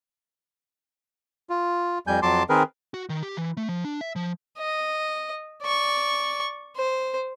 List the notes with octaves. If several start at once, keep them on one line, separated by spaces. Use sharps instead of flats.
F4
F2 G3 G#5 G6
F2 F#3 A5 C6 D6
D#3 C4 G#4 A#4 B4
F#4
D#3
G4
E3
A3
F3
D4
E5
F3
D#5
D5 C#6
C5